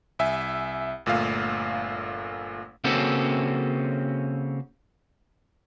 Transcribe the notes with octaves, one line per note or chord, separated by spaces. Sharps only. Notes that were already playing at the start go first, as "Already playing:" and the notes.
C2 E5 G#5
G1 A#2 A3 F5
C#3 A#3 C4 C#4 F#4 A4